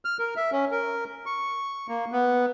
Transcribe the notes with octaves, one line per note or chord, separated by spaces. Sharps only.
F6
A#4
E5
C#4
A#4
C#6
A#3
B3